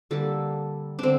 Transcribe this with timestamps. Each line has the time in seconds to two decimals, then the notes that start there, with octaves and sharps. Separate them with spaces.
0.11 D3 G3 A#3 A4
0.99 D3 C4 D4